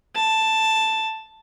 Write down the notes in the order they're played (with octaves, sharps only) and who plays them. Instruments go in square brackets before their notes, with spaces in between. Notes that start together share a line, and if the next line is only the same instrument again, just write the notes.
[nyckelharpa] A5